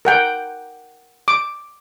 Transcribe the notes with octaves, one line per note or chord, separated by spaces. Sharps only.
A#4 F#5 G5
D6